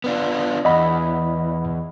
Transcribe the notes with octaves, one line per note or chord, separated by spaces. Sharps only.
B3 D4 F4
E2 D#5 F#5 B5